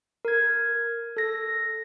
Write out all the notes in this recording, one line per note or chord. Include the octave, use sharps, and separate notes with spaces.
A#4 G#6
A4 A#6